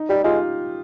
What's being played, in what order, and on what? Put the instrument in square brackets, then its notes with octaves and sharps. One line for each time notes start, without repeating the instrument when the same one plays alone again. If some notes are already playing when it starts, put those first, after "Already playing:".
Already playing: [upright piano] D#4
[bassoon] G3 [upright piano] G4
[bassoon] G#3 [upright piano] F4